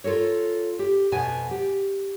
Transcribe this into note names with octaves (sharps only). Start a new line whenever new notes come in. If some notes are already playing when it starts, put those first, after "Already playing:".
F4 A4 A#4 C#5
G4
F2 B2 B3 G#5
G4